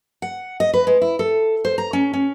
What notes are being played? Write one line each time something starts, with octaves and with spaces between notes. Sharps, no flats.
F#5
D#5
B4
G#3
E4
A4
C5
A#5
C#4
C#4